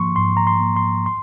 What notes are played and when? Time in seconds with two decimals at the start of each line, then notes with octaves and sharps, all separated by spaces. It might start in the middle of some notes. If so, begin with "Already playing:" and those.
Already playing: G#2 F3 A#3 C6 C#6
0.16 G#2 C6
0.37 A#5
0.47 C6
0.61 F3 A#3
0.76 C6
1.06 C6